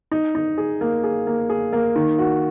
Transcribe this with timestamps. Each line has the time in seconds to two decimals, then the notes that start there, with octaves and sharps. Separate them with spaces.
0.12 D#4
0.35 D#4
0.58 G#4
0.81 A#3
1.04 G#4
1.27 A#3
1.50 G#4
1.73 A#3
1.96 D#3
2.19 F#4